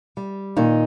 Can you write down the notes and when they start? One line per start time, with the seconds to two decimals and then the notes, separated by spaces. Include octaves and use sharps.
0.17 G3
0.57 A#2 D#3 D#4